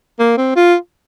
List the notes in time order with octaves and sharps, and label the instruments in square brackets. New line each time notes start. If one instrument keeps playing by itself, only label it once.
[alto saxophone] A#3
C4
F4